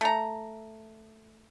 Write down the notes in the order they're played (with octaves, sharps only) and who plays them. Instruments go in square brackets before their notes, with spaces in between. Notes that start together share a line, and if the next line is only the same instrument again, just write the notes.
[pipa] A3 A#5